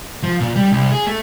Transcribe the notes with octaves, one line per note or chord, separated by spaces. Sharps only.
F3
A#2
G3
C2
G#4
A3